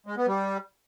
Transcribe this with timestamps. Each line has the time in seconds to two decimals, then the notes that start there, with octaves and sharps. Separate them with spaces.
0.07 G#3
0.17 B3
0.27 G3